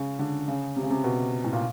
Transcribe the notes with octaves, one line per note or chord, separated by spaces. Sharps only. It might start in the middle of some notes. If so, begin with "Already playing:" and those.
Already playing: C#3
D3
C#3
C3
C#3
C3
B2
A2
A#2